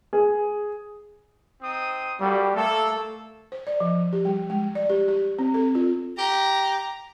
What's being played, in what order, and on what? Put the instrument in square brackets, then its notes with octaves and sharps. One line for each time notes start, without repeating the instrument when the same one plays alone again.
[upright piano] G#4
[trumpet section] C4 D#4 D#6
[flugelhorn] G3 [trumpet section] A#3 F#4 A4
[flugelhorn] A3 [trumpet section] A#3 A4
[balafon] C5
D5
F3
G4
G3
G#3
D5
G4
G4
C4
A4
F4
[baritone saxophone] G4 [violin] A#5